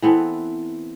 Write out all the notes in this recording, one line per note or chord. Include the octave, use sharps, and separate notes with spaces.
E3 B3 C4 A4